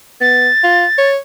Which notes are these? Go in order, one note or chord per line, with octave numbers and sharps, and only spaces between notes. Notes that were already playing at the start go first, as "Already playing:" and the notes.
B3 A6
F4
C#5